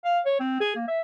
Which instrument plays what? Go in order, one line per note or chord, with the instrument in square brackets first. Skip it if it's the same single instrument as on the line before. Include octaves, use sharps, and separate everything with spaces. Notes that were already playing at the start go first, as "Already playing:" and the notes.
[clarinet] F5
C#5
C4
G#4
A#3
E5